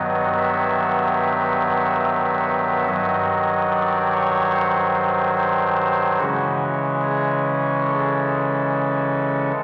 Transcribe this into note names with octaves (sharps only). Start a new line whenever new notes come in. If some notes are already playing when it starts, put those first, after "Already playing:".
Already playing: G2 D#3 F#3 B3 D#5
E5
E5
G2 D#3 F#3 D#5
D5
C#5
C5
C5
C#3 E3 G#3 C#4 F#4
G#4
A4